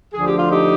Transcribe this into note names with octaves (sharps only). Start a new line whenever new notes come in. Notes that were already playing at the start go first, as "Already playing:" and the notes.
D2 D3 F3 G#4
G4
F4
D#4 G4